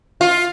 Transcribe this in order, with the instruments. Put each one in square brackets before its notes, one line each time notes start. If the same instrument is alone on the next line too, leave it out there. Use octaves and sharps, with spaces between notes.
[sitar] F4